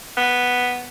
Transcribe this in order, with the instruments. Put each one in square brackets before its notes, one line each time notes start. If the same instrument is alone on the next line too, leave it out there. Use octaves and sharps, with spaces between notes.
[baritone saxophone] B3